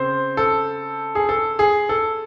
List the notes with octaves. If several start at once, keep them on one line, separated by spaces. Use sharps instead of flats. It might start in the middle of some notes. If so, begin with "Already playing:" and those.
Already playing: C#3 C4 C5
A4
G#4
A4
G#4
A4